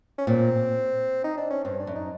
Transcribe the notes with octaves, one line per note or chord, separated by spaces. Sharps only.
C#4
A#2 C4
D#4
D4
C#4
G2 C4
D4
F#2
D#4